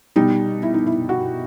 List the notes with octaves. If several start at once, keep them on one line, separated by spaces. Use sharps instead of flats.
B2 G3 D#4
E4
D#4
E4
F#4